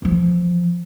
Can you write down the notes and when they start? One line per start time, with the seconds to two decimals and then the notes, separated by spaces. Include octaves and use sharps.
0.02 E3 F3